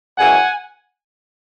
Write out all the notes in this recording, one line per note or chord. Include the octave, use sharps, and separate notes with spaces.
F#2 C#3 E3 G#3 F#5 G#5